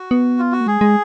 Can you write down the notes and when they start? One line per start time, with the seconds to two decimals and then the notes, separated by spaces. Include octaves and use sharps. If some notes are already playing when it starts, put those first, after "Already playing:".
Already playing: F#4
0.11 B3
0.39 F4
0.52 F#4
0.61 A#3
0.67 G#3 G#4
0.81 G#3